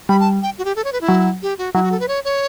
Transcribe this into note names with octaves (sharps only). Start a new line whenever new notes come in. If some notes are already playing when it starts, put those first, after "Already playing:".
G3 B5
A5
G5
F#4
G4
A4
C#5
B4
E4
F#3
G4
F#4
F#3 E4
F#4
A4
B4
C#5
C#5